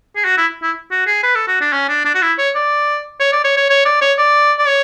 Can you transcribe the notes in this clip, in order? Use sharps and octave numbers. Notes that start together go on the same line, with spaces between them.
G#4
F#4
E4
E4
F#4
G#4
B4
A4
F#4
D4
C#4
D4
D4
F#4
E4
C#5
D5
C#5
D5
C#5
C#5
C#5
D5
C#5
D5
D5
C#5